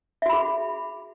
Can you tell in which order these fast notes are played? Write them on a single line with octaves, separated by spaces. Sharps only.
E5 F#4 B5 G#4